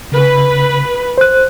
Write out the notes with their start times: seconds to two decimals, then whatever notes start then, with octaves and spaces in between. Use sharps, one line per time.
0.12 C#3 B4
1.18 C5 F#6